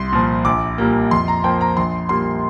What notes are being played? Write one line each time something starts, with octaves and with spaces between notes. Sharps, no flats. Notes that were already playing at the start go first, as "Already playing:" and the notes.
Already playing: C2 C6
A#2 F3
A#1 D6
A#2 G3 A#3
F2 C6
A#5
F3 A#3 G5
A#5
A#1 C6
A#2 G3 A#3 C6